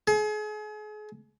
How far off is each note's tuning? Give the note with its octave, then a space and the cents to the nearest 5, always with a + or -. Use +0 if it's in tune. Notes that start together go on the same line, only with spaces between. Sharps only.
G#4 +35